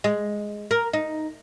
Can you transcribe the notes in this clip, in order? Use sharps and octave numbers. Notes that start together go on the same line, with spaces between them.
G#3
A#4
D#4